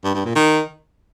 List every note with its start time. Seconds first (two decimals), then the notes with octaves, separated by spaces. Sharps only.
0.04 G2
0.15 G2
0.25 A#2
0.36 D#3